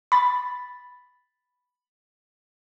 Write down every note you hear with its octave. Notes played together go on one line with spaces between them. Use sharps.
B5 A6